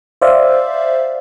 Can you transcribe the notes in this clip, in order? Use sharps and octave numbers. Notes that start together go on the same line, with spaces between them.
C5 D5 E5 F5